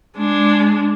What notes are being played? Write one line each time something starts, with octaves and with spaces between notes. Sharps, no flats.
G#3 D4